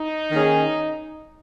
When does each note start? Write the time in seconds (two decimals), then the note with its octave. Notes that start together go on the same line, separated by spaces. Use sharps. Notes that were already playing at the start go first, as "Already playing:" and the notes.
Already playing: D#4
0.31 D#3 A#3 C#4 G#4